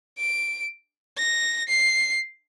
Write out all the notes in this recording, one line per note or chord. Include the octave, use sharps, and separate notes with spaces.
D7
A#6
C7